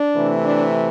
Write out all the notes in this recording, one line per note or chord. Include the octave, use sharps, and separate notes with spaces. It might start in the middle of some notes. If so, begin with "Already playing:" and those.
Already playing: D4
C3 E3 A3
D4